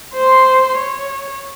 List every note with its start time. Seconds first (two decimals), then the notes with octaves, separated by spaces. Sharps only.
0.14 C5 C6
0.78 C#5